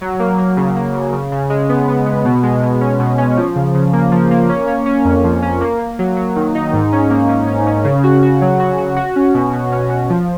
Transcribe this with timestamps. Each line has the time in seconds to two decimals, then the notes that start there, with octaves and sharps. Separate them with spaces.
0.01 F#3
0.19 A#3
0.38 A#3
0.57 C#3
0.76 A#3
0.94 C#3
1.13 C#3
1.32 C#3
1.50 G#3
1.69 B3
1.88 B3
2.06 B3
2.25 B2
2.43 G#3
2.63 B2
2.81 C#4
2.99 B2
3.18 C#4
3.37 F3
3.56 C#3
3.75 C#3
3.93 A#3
4.12 F3
4.31 A#3
4.49 C#4
4.68 C#4
4.86 C#4
5.05 F2
5.24 F3
5.43 C#4
5.61 A#3
5.80 A#3
5.99 F#3
6.17 F#3
6.36 D#3
6.55 D#4
6.73 G#2
6.92 C#4
7.10 A#3
7.29 C#4
7.47 C#4
7.67 C#4
7.84 C#3
8.04 F#4
8.23 F#4
8.41 F#3
8.60 F#4
8.78 F#4
8.97 F#4
9.16 C#4
9.34 B2
9.53 B2
9.72 C#4
9.90 F#4
10.10 F3